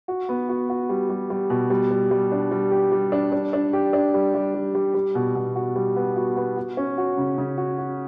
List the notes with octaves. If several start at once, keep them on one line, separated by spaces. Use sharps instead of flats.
F#4
B3
F#4
F#4
G3
G3
G3
B2
G3
G3
G3
D4
G3
G4
G3
D4
D4
D4
G4
D4
G3
G3
G3
G3
G3
B2
B2
F#4
G3
B3
F#4
B3
F#4
C#4
F#4
C#3
C#3
F#4
F#4